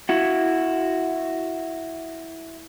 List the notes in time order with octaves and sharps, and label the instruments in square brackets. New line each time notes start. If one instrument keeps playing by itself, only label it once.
[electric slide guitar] E4 F#4